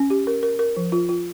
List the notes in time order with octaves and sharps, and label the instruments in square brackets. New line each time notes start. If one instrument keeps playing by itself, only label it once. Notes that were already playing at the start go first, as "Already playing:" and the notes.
Already playing: [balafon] C#4
G4
A#4
A#4
A#4
F3
F4
F4